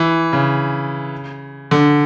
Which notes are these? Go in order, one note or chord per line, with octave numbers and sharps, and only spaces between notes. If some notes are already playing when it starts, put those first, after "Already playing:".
Already playing: E3
C#3
D3